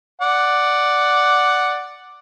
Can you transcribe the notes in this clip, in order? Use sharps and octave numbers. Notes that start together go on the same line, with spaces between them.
D5 F#5